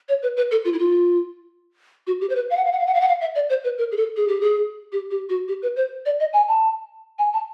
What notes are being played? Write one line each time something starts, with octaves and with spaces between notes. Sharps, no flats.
C#5
B4
B4
A4
F4
E4
F4
F#4
G4
C5
B4
F5
F#5
F5
F#5
F5
F#5
F5
F#5
F5
E5
D5
C5
B4
A#4
G#4
A4
G#4
G4
G#4
G4
G4
F#4
G4
B4
C5
D5
D#5
G#5
A5
G#5
A5